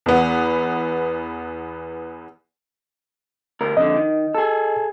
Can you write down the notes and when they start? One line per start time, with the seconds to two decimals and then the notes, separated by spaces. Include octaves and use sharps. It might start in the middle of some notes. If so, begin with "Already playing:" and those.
0.06 E2 B3
3.61 D2 A#4
3.77 F2 D3 D#5
3.96 D#3
4.35 G#4 A4